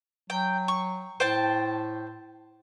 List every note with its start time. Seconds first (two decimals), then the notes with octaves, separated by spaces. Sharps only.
0.30 F#3 G5
0.68 C#6
1.20 A2 C5 G5 A5